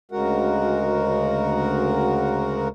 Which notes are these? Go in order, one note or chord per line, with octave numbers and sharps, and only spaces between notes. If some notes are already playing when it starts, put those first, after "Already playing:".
D2 C#3 G#3 F#4 A#4 F#5